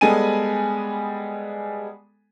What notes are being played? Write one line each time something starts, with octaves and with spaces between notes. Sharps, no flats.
G3 G#3 B3 A4 G#5 D#7